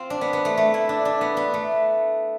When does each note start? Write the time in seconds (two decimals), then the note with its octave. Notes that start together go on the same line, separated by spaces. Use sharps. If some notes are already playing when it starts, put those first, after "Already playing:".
Already playing: C4 F4
0.10 D4
0.21 B3
0.33 B3
0.45 A3
0.57 A3
0.74 E4
0.89 D4
1.05 D4
1.21 B3
1.37 B3
1.54 A3